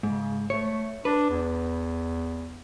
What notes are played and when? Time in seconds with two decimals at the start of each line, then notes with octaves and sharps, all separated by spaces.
0.03 G#2 C#3
0.50 A3 C#5
1.05 D4 B4
1.30 E2